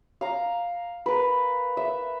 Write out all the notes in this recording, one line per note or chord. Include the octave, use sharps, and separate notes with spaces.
F5 A#5
A#4 B4
E5